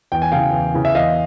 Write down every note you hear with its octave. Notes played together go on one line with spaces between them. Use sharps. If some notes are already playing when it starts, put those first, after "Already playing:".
E2 G5
G#5
C#3 E3 F5 G5
E2
C#3 E3
E5
E2 D#5 F5